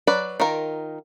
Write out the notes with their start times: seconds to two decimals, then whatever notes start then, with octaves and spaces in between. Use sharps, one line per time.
0.07 F#3 B4 D5
0.40 D#3 F4 A#4